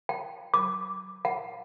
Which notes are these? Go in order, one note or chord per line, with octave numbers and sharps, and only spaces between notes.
G5
D6
F#5